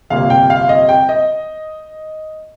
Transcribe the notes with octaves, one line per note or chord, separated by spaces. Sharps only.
G1 F2 C3 G3 A#3 F5
G5
F5
D#5
G5
D#5